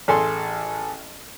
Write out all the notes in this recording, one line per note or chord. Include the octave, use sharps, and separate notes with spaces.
A1 G#4 A4 C6